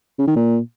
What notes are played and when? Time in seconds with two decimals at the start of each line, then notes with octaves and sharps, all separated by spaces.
0.18 C#3
0.27 D#3
0.36 A#2